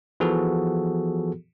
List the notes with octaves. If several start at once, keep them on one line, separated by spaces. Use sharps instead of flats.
E3 F3 B3 F#4 G#4 A4